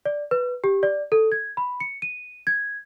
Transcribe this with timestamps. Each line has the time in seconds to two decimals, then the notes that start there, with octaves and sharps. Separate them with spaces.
0.06 D5
0.31 B4
0.64 G4
0.83 D5
1.12 A4
1.32 G#6
1.57 B5
1.80 C#7
2.02 D#7
2.47 G#6